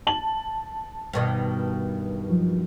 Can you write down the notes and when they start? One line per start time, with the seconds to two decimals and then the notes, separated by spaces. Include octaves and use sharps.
0.07 A5 F#7
1.13 G2 B2 D#3
2.30 F3 F#3